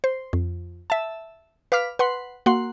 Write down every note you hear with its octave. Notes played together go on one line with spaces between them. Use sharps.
C5
F2
E5 A5
B4 F5 D6 F6 B6
B4 F#5 C6
A#3 F#4 F#5 C6